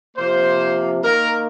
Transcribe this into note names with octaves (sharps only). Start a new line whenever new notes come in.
C3 F3 A#3 C5
D#3 A#3 A#4